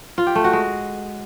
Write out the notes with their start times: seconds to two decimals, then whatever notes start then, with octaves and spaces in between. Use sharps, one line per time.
0.18 F4
0.27 G4
0.35 A3
0.44 F#4
0.53 G#3